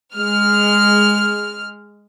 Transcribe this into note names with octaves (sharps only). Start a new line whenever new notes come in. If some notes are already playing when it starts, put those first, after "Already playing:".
G#3 F6